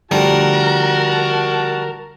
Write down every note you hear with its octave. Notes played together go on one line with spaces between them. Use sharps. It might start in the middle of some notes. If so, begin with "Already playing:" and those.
D3 F3 G3 A3 F#4 A#4 A5